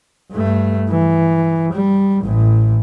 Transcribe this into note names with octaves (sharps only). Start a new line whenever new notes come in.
G2 A3
E3
G3
A1 A2